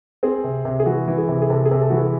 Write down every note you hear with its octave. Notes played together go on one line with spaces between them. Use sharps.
C4 G#4
C3
C3
G#4
E3 F#4
E3
G#4
C3
G#4
C3 A4
G#4
C3
A4
E3 F#4
G#4